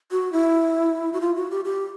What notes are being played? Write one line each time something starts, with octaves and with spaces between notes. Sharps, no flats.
F#4
E4
F#4
F4
F#4
G4
G4